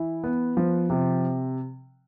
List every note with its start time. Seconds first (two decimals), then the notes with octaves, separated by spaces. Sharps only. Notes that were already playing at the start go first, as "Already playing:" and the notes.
Already playing: E3 E4
0.24 B3
0.57 F3
0.90 C3